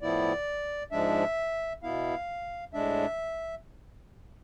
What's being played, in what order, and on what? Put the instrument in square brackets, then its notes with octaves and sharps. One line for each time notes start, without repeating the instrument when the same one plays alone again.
[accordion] A2 F3 B3 E4 D5
G#2 F3 G#3 D4 E5
B2 B3 E4 F5
A2 G#3 D4 E5